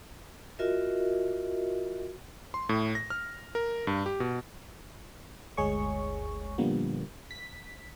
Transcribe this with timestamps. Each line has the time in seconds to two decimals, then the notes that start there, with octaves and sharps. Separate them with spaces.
0.59 F4 F#4 A#4 D#5 E5
2.54 C6
2.69 A2
2.95 A#6
3.10 F6
3.55 A#4
3.87 G2
4.06 G4
4.20 B2
5.57 G1 D2 G#3 G#4 C#5 C#6
6.58 A#2 D3 F3 G3 A#3 B3
7.31 B6